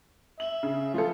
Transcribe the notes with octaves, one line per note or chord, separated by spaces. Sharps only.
E5 F#7
C#3
F3 F4 A4